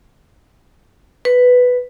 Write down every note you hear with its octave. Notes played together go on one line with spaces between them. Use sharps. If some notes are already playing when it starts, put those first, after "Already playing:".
B4